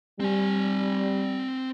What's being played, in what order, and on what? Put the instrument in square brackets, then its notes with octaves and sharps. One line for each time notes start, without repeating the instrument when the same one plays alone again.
[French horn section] G3 [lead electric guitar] C4 G#5